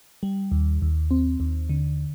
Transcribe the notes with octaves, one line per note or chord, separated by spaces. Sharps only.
G3
D#2
D#2
C4
D#2
D3